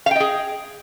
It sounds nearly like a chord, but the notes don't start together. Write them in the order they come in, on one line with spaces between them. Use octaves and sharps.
F5 G5 D#5 G#4